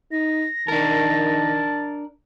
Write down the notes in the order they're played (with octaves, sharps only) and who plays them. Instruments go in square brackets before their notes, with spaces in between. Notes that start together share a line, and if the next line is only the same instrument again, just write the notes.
[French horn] D#4 [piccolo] A#6
[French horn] D#3 [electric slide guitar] D4 A#4 [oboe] A5